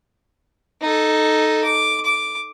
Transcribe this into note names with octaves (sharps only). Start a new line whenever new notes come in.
D#4 A4
D6
D6